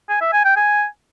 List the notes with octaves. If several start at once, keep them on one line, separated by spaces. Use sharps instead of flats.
G#5
E5
G#5
G5
G#5